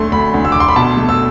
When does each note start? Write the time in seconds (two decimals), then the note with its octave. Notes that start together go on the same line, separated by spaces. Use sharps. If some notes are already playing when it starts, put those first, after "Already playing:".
Already playing: D2 D3 A3 C6
0.12 D2 B5
0.34 D2
0.45 E6
0.52 D3 D6
0.60 C6
0.68 B5
0.75 B2 A5
0.97 A3
1.09 E6